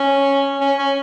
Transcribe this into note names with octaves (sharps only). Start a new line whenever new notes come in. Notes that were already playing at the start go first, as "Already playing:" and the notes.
Already playing: C#4
C#4
C#4